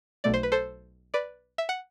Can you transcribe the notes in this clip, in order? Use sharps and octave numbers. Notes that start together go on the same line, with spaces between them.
B1 B2 A3 D5
C5
B4
A4 C5
B4 D5
E5
F#5